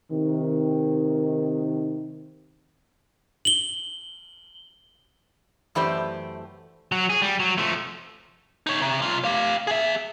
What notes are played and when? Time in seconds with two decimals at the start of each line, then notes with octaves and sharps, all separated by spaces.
0.10 C3 D#3
3.45 F#7 G7
5.75 F#2 E3 A3 G4 C5 D5
6.92 F#3
7.10 G#4
7.22 G3
7.40 F#3
7.58 F3 A3
8.67 D#4 C#5
8.82 C3
9.02 B1 F4
9.25 G4 F5
9.67 G#4 E5